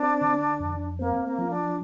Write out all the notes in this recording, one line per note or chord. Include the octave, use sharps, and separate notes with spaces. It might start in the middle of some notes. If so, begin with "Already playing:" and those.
Already playing: C4 D4
D3
F2
A#3 C4
A#3
F3
D4